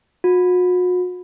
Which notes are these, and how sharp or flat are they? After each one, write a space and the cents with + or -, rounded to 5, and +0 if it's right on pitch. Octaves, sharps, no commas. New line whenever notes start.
F#4 -40